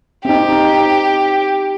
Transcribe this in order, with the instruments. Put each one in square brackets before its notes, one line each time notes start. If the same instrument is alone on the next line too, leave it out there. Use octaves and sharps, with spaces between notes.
[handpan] C4 D#4 [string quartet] G4